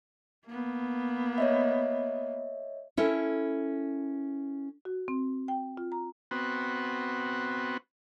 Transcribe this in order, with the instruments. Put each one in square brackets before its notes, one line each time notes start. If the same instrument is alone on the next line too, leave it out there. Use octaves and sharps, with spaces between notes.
[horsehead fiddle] A#3 B3
[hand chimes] C#5 D#5 E5
[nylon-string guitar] C#4 E4 A4 A#4
[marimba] F#4
C4
G5
F4
A#5
[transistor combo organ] B3 C4 F#4